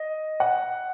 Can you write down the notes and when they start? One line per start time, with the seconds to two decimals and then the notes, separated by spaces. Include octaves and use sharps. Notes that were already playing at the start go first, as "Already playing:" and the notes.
Already playing: D#5
0.40 F#5